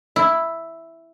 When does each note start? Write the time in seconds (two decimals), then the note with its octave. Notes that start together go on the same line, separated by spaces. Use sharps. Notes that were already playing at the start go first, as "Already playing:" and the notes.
0.16 E4